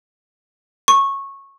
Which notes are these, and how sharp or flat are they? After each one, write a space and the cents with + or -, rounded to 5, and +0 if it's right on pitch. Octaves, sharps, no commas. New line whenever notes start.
C#6 -15